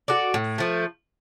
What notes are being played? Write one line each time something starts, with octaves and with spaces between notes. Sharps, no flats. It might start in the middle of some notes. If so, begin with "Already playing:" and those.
F#4 A4 D5
A2
F3 A3